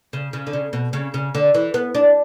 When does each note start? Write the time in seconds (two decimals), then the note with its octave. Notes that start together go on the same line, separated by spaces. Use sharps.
0.13 C#3
0.33 C#3
0.47 D3
0.53 C#3
0.73 B2
0.93 C#3
1.14 C#3
1.35 D3
1.54 E3
1.74 B3
1.95 D4